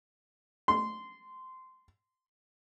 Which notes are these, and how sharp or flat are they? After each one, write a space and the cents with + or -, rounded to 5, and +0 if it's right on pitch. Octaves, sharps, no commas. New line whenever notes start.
C6 -15